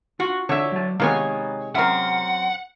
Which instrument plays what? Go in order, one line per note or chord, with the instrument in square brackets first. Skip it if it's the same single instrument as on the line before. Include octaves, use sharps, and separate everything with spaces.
[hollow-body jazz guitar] F4 [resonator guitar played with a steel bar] F#4
[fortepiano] D3 [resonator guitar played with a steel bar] C#5 E5
[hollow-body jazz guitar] F#3 A5
[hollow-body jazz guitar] C3 G#3 G#4 [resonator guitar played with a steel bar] D#3 C#5 G#5 [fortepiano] A#3 B3
[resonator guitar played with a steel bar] F#2 C4 [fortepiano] A#4 E5 [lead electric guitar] F#5